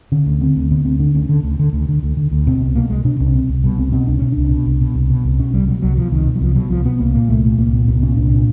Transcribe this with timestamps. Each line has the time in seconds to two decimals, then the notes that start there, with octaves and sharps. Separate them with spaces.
0.12 D3 C#4
0.26 D2
0.41 D3 C4
0.56 D2
0.71 D3 B3
0.85 D2 C4
1.00 D3 D4
1.15 D2 C#4
1.29 D3
1.43 D2
1.59 D3
1.73 D2
1.89 D3
2.03 D2
2.17 D3
2.31 D2
2.47 B2 C4
2.61 C2 B3
2.75 B2 A#3
2.90 C2 G#3
3.04 B2 D4
3.20 C2 C#4
3.35 B2 C4
3.49 C2
3.64 B2 G3
3.78 C2 C4
3.92 B2 C4
4.07 C2 D4
4.19 B2 C#4
4.32 C2 D4
4.51 B2
4.66 C2
4.81 B2
4.95 C2
5.10 B2
5.24 C2
5.39 B2 C#4
5.54 C2 G3
5.68 B2 F#3
5.82 C2 F#3
5.97 B2 F3
6.12 C2 D#3
6.27 B2
6.36 F#3
6.41 C2 F3
6.55 B2 F#3
6.70 C2 F3
6.85 B2 B3
6.99 C2 A#3
7.14 A#2 A#3
7.29 C2 A3
7.44 A#2 A3
7.58 C2 A#3
7.73 A#2 B3
7.88 C2 B3
8.02 A#2 C#4
8.17 C2 D4
8.31 A#2